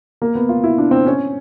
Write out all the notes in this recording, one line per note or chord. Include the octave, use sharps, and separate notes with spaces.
A#3
B3
F4
E4
D4
C4
C#4